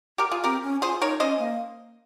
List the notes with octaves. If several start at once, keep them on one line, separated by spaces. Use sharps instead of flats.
G4 A#4
F4 G#4
C4 G4 A#4
C#4
F4 G#4 C5
D#4 A#4 C#5
C#4 C5 D#5
A#3